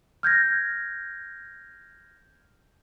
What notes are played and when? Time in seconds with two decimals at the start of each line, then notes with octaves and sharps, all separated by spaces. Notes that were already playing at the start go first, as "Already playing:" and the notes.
0.23 F6 G6 G#6 A#6